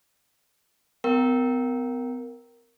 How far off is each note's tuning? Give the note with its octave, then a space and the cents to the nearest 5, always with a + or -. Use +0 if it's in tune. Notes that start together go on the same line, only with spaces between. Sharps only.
B3 +45 A#4 +0 G5 -15